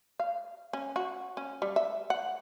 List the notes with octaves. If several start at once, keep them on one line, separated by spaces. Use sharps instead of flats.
F5
C#4
F#4
C#4
G3
E5
F#5